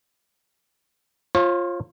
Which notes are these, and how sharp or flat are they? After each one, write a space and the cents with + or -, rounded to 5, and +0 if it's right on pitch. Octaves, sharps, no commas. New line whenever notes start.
F4 +0 C#5 -45